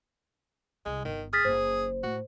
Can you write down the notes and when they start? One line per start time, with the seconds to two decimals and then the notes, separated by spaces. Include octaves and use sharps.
0.86 C2 G#3
1.05 G1 D#3
1.33 G#4 F6 A6 B6
1.45 F#1 C5
2.03 A2 F#4